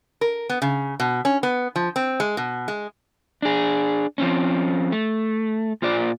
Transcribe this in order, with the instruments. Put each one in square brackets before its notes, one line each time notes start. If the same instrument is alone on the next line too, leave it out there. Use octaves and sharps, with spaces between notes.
[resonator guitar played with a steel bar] A#4
B3
C#3
B2
C#4
B3
F3
C4
G#3
B2
G#3
[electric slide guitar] D4 G#4
F3 C4 C#4
A3
A#2 F4 C5 D5